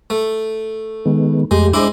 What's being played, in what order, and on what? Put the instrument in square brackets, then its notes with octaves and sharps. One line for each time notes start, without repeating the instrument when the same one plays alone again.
[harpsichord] A3
[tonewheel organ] D#3 G#3 B3
[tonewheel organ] F2 A3 G4 [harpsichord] G#3
[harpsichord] G#3 E4 [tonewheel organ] D4 C5 D6